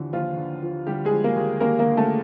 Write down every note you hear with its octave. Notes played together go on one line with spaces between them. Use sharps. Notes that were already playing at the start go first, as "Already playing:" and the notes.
Already playing: D#2 D3 E3 F3
D#2 F3 F4
D3
F3
D3 G3 G4
G#3 G#4
F3
A#3 A#4
D#2
D#2 A#3 A#4
A#3 A#4
D3
A3 A4